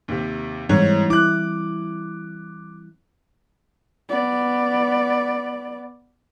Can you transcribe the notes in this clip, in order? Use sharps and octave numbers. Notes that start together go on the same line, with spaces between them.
D#2 C3
G#2 E3 G3 C4 C#5
E4 D6 F#6
B3 D5